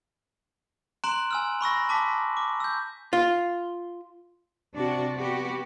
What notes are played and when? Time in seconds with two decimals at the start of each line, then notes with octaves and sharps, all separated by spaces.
1.04 A#5 C6 F#6 D7 E7 F#7
1.31 G#5 E6 F6
1.61 B5 C#6 E6 A#6
1.89 A5 D6 B6
2.37 D6
2.60 E6 G6
3.13 F4
4.74 C3 D4 F#4
5.14 B3 F#4 G4